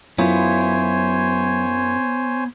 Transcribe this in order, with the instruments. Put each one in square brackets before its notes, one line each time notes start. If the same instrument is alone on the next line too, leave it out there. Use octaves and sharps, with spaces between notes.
[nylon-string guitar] F#2 E4 F4 [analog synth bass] F#3 [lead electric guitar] B3 [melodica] C5 C#5 G#5